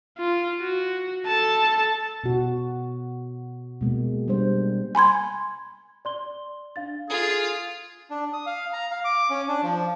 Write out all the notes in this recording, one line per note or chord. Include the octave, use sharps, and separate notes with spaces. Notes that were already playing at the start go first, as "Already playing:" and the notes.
F4
F#4
A4 A5
B2 F#4
B2 G#3 A#3
G3 D4 C5
G#5 B5 C6 G#6
D5 C6 G7
D4 F5 A6
F4 G#4 A4
D4
D#6
F5
A#5
F5
D6
C#4
D4
F3